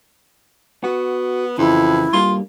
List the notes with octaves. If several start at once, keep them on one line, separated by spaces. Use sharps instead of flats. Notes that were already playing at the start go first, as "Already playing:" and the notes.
B3 F#4
F2 C#3 E3 E4
G2 G3 A#3 F4